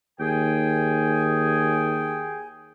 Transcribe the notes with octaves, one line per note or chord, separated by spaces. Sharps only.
D#2 G#4 G5 G#5